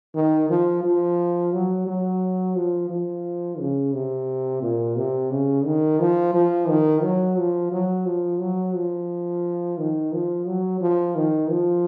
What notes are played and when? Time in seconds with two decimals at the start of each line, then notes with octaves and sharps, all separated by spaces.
0.15 D#3
0.49 F3
0.84 F3
1.53 F#3
1.87 F#3
2.55 F3
2.89 F3
3.59 C#3
3.93 C3
4.62 A#2
4.96 C3
5.31 C#3
5.65 D#3
5.99 F3
6.34 F3
6.68 D#3
7.02 F#3
7.37 F3
7.71 F#3
8.06 F3
8.40 F#3
8.75 F3
9.78 D#3
10.12 F3
10.46 F#3
10.81 F3
11.15 D#3
11.49 F3